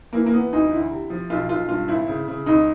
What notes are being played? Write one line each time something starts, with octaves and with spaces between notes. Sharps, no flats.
E3 A#3
A#3
E3 B3
D2 D#4
D3 E4
C3
F3
B1 F4
B1 F4
G2 F4
G#1 E4
C#3
C#3
C#2 D#4